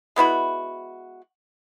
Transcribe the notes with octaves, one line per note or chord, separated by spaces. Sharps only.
G#3 B3 E4 F#4